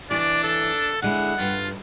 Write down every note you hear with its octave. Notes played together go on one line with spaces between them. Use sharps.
E3 D4 C#5 D5
A4
D3 G#3 E4 F#5
G2 F4